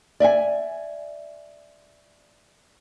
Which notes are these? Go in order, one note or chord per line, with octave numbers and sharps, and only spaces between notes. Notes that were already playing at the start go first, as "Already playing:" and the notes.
D5 E5 F#5 G#5